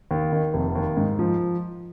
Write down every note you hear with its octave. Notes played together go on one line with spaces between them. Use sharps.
D#2
D#3
F1
D#2
G#2
F3